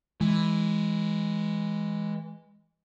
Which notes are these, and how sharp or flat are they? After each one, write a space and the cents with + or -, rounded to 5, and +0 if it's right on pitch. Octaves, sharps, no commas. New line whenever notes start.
E3 +0 G#3 +0